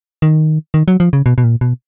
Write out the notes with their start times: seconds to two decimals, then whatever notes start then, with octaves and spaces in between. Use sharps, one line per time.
0.22 D#3
0.74 D#3
0.88 F#3
1.00 F3
1.13 C#3
1.26 B2
1.38 B2
1.44 A#2
1.61 B2